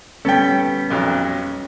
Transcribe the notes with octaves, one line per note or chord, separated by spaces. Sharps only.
G3 B3 C#4 A4 G5
B1 F2 F#3